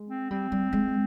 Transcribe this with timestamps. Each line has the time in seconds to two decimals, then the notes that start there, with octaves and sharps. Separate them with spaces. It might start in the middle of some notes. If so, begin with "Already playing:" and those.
Already playing: G#3
0.09 C4
0.31 G3 C4
0.52 G3
0.73 G#3